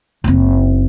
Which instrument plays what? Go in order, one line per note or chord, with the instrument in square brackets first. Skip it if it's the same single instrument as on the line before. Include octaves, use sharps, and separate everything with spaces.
[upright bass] F#1 C4